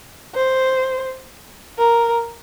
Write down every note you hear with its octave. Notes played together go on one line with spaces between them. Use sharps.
C5
A#4